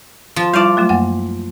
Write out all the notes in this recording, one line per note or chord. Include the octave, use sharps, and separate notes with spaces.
F3 A5
G3 E4 F4 D5 F5
F#3 A3 F4
F#2 A#3 F#5